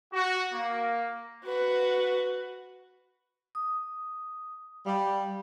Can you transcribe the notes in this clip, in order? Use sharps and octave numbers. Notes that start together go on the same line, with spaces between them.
F#4
A#3
F#4 B4
D#6
G3 F5